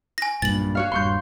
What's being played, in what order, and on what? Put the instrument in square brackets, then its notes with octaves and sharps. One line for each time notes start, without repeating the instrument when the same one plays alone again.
[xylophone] G#5 A#6
[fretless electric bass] B1 G2 A#2 [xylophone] A6 F#7
[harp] F#4 C#5 F5
[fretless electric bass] D#1 G2 [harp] C6 C#6 G6